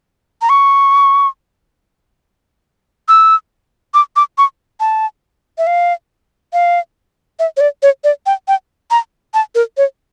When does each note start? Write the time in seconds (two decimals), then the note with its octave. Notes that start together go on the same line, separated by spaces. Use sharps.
0.42 A#5
0.49 C#6
3.09 E6
3.94 D6
4.16 D6
4.38 C#6
4.80 A5
5.58 E5
5.67 F5
6.53 F5
7.39 E5
7.57 C#5
7.61 D5
7.83 C#5
8.04 D5
8.26 G5
8.48 G5
8.91 A#5
9.34 A5
9.55 A#4
9.77 C#5